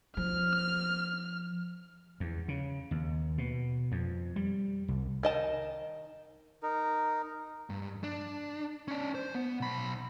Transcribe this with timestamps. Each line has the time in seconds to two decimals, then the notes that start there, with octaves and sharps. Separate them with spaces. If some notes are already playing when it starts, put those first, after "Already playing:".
0.17 F3 F6
2.20 E2
2.48 C#3
2.91 D#2
3.38 B2
3.92 F2
4.36 G3
4.88 C2
5.23 D#3 D#5 A5
6.63 D#4 A#4
7.70 G2
8.04 D4
8.88 C#4 D5
9.15 C5
9.35 B3
9.61 B1 B5